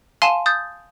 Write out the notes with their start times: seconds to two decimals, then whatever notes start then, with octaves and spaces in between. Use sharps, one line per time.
0.22 F5 G#5 A5 C6 D#7 E7
0.46 D#6 G6 A6